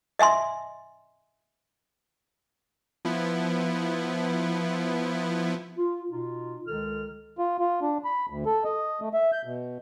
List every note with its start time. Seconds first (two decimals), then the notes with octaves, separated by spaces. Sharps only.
0.19 D#5 E5 G#5 C6
3.05 F3 B3 E4
5.77 F4
6.10 B2 D#4 F4
6.66 C#2 D#3 G#3 A4 F6
7.38 F4
7.59 F4
7.82 D4
8.05 B5
8.30 D2
8.46 A4
8.64 D#5
9.01 A3
9.13 E5
9.32 G6
9.45 B2